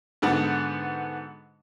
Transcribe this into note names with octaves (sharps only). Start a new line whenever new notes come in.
G#2 D3 B3 F#4